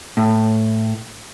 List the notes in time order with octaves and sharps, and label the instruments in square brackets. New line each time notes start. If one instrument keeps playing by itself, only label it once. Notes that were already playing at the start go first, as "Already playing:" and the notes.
[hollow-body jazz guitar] A2